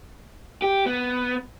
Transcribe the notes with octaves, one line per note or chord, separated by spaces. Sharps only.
G4
B3